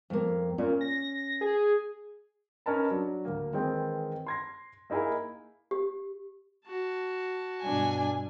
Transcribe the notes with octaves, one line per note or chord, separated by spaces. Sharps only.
F2 A#3
A#2 C#4
A#6
G#4
C#4 D#4 A#4 B4 A5 B5
F#3 D4
D2 A#3
D#3 E3 G#3 C4 D#4
C6 G#6 A#6
A#3 D#4 E4 G#4 A#4
G4
F#4 A5
G2 B2 D4 G#5